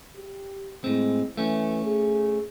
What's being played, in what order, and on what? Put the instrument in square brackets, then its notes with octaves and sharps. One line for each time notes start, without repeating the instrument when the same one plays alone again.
[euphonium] G4
[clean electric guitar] A2 C4 [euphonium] G#3
[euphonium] E3 [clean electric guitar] A3 C#4
[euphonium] G#4